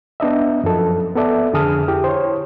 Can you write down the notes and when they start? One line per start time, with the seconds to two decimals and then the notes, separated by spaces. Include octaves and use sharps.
0.20 B3 D4 D#5 E5
0.64 F#2 F3 A4
1.16 B3 A4 D5 E5
1.53 F2 D3 G#4 A5 D#6 F6
1.88 E4 G4
2.04 C5 C#5